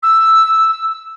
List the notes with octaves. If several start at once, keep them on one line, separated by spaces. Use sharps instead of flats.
E6